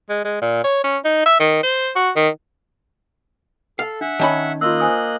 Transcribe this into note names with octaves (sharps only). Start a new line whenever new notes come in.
G#3
G#3
A#2
C#5
C#4
D#4
E5
D#3
C5
F#4
D#3
A4 F5
D4 E5 F#5
D#3 C#4 A5 B5
A#3 F4 D#5 C6 E6 F#6
C5 G#5 D#6